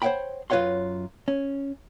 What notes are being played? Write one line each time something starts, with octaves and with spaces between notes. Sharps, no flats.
C5 C#5 E5 F#5 G5 B5
F#2 F4 B4 C#5 F#5 C6
C#4